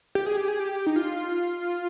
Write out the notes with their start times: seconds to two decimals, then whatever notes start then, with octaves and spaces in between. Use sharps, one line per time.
0.15 G4
0.26 G#4
0.37 G4
0.48 G#4
0.59 G4
0.86 D#4
0.96 F4